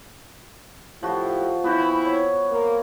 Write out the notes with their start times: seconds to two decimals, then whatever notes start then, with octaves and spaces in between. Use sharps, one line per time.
1.03 A2 F3 E4 F#4 G4
1.64 E3 B3 C4 E4 F#4 C5
2.05 C#5
2.50 A#3